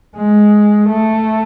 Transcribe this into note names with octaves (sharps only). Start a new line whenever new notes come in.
G#3
A3